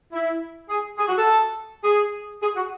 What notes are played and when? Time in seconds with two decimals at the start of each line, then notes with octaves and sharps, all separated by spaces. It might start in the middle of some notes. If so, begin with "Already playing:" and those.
0.13 E4
0.69 G#4
0.98 G#4
1.08 F#4
1.17 A4
1.84 G#4
2.41 G#4
2.55 F#4